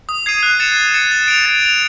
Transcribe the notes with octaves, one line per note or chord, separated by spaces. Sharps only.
D#6
G#6 C7 D#7
F#6
A6 C#7 E7
F#6
A6 C#7 E7
A6
D7 F7
A6
D7 F7